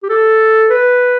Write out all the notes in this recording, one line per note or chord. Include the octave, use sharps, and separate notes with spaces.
G4
A4
B4